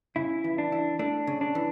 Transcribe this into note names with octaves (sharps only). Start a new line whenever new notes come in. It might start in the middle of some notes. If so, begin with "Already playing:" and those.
C#3 E4
E3
D4
E4
A3 D4
C#3
D4
E3